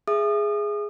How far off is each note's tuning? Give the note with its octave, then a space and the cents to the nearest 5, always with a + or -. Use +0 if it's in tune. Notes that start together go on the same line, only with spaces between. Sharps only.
G#4 +0 E5 +20 D#6 -35